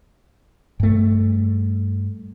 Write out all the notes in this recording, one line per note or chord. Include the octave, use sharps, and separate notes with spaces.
G2 A3